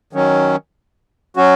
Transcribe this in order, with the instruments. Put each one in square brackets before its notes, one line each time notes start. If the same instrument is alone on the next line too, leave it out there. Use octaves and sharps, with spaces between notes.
[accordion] D#3 F#3 C#4
F#3 C#4 F#4